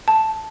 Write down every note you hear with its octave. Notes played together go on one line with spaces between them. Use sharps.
A5